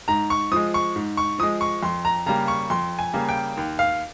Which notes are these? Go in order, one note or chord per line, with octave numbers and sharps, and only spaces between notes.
G#2 A#5
C#6
F3 G#3 D#6
C#6
G#2
C#6
F3 G#3 D#6
C#6
F2 C6
A#5
C#3 G3 A#3 A#5
C#6
F2 C6
G#5
C#3 G3 A#3
G5
D#2
F5